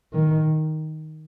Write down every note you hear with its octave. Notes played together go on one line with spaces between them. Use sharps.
D#3